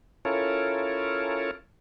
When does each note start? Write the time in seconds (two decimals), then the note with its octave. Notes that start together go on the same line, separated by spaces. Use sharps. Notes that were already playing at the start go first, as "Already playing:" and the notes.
0.25 C#4 E4 F4 A4 A#4 C#5